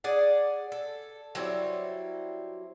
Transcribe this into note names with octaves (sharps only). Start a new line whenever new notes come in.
G#4 D5 F#5
A4
F#3 G3 C4 E4